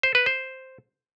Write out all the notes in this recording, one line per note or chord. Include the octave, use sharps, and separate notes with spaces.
C5
B4
C5